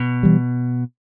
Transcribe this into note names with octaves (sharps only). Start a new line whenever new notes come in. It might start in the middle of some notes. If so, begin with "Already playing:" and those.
Already playing: B2
E3 G3